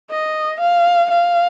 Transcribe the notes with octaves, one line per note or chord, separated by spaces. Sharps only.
D#5
F5
F5